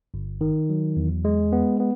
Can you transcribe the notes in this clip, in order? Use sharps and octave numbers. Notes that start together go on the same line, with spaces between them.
G1
D#3
F#3
E2
G#3
B3
B3